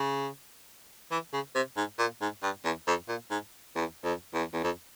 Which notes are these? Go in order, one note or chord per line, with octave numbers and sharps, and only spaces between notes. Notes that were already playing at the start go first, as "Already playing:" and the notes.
Already playing: C#3
E3
C#3
C3
G#2
A#2
G#2
G2
E2
F2
A#2
G#2
E2
F2
E2
E2
F2